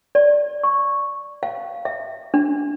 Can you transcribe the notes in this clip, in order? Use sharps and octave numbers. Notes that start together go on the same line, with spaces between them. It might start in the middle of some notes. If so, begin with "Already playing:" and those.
D5
C#6
F5
E5
D4